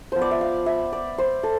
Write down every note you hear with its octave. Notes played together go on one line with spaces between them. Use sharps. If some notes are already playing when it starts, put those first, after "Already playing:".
F3 B3 F4 C5
D5
E5
F5
E5
D5
C5
A4